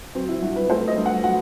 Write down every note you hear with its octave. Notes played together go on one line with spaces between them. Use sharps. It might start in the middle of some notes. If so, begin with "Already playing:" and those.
F#3 C4
E4
G2 F#4
B4
A3 C5
D#5
G2
F#5
F#3 F#5